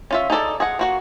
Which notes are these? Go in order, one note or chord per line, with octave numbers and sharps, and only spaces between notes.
C#4 F4 E5
D#4 G#4 A4 D5
G#4 D#5 F#5
A#3 F#4 F#5